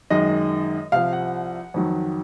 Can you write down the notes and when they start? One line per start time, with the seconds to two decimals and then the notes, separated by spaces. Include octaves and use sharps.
0.10 F#2 D#3 G#3 D#5
0.92 C2 C3 F3 F5
1.13 F#5
1.74 F2 D#3 F#3